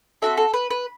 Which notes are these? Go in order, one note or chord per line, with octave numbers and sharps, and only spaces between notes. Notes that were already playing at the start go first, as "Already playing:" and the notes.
C4 F#4 A4 E5
A4
B4
B4